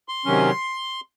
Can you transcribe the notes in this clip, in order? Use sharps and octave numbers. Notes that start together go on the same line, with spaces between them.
C6
C3 D#3 F#3 C#4